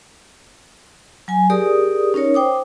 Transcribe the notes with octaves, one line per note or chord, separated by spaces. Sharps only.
F#3 G#5
G4 G#4 A#4 D5 D#6
C#4 D#4 A#4 C#5
C5 G5 D6 D#6